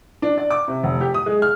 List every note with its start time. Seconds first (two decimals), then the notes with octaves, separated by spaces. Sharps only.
0.22 D4
0.38 D5
0.50 D6
0.68 C3
0.83 F1
1.01 G4
1.14 D#6
1.26 G#3
1.42 F6